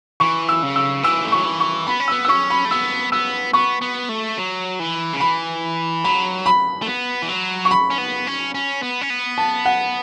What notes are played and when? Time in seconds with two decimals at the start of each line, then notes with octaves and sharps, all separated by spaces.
0.20 E3 C#6
0.49 E6
0.63 C#3
0.76 E6
1.03 E3 E6
1.25 A3
1.32 F#3 C#6
1.45 E3
1.60 C#6
1.87 B3 B5
2.00 C#4
2.08 B3 E6
2.25 E6
2.28 C#4 C#6
2.50 B5
2.65 A3
2.71 B3 E6
3.12 B3 E6
3.53 B3 C#6
3.82 B3
4.09 A3
4.38 F#3
4.80 E3
5.13 C#3
5.20 E3 B5
6.04 F#3 B5
6.46 B5
6.82 A3
6.87 B3
7.22 E3
7.29 F#3
7.65 C#6
7.71 B5
7.90 C#4
7.98 B3
8.27 C#4
8.55 C#4
8.82 B3
9.01 C#4
9.10 B3
9.38 A5
9.65 F#5